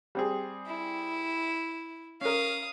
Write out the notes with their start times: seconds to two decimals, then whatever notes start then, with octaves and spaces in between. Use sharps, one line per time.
0.15 G3 C4 G#4
0.67 E4
2.21 C#4 A#4 F5 D#6